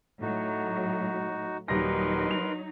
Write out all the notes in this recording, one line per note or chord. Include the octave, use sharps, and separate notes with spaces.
A2 F#3 D#4 F#4
D#1 F#3 D#4 A#4 B4 C6 A#6
F7